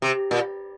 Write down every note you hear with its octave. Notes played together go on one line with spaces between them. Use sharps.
C3
A#2